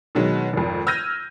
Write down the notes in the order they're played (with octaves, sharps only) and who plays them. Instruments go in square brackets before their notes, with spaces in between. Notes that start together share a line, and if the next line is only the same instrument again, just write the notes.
[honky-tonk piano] B2 D#3 F#3 G#3
G#1 F2
E6 F6 G6 G#6 A#6 D#7